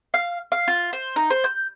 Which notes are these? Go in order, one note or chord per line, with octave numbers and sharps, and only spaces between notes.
F5
F5
F4
C5
D#4
C5
G6